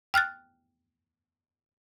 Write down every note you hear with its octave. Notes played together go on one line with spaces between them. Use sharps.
G5 F6 F#6 A6